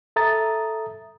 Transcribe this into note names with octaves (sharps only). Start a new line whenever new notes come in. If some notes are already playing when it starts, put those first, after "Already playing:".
A4 E5 A#5 D#6 A6